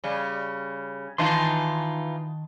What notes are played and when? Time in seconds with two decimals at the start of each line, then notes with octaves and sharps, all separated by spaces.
0.04 C#3 G3
1.18 D#3 E3 D#4 F4 A5 C6